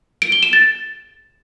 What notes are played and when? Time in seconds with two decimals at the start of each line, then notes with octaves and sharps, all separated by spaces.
0.22 D7
0.32 G7
0.43 E7
0.53 A6